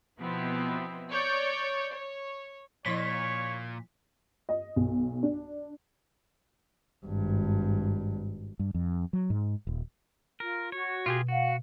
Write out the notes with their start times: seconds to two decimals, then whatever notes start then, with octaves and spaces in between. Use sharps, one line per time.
0.19 B2 F3 B3 C4 E4
1.11 C#5 D5 G6
1.94 C#5
2.86 A#2 F3 E4 C#5 D#5 B6
4.49 D#5
4.76 B1
5.23 D4
7.06 G#1 G2
8.59 G2
8.74 F2
9.13 F#3
9.30 G#2
9.67 D#1
10.40 F4 A#4
10.72 F#4 C#5
11.06 B2 F4 G4 G#4
11.28 F#4 F5 F#5